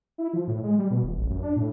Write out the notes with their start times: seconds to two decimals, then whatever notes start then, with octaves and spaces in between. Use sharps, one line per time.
0.18 E4
0.33 F3
0.48 A2
0.63 G#3
0.79 G3
0.91 B2
1.03 D#1
1.18 A1
1.30 F#2
1.43 D4
1.56 A2